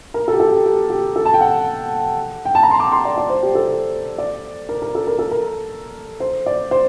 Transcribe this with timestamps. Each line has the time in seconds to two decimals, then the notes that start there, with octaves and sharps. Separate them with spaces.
0.14 A#4
0.28 A4
0.33 G4
0.40 A4
0.52 G4
0.65 G4
0.90 G4
1.16 A4
1.25 A5
1.34 G5
1.41 F#5
2.45 G5
2.55 A5
2.63 A#5
2.71 C6
2.80 D6
2.92 C6
3.05 D5
3.18 D5
3.30 C5
3.43 G4
3.55 A4
3.67 C5
4.18 D5
4.69 A#4
4.82 A#4
4.95 A4
5.07 A#4
5.19 A4
5.31 A#4
6.20 C5
6.46 D5
6.71 C5